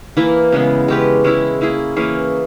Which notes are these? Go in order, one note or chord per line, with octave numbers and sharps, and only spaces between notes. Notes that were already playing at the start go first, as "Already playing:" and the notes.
E3 A#3 E4
C#3 G#3 B3
G#3 C#4 G4 B4
G#3 C#4 E4
A#3 E4 G#4
E3 A#3 C#4 G#4